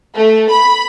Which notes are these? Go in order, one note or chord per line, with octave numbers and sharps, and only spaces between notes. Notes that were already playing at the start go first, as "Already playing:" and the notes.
A3
B5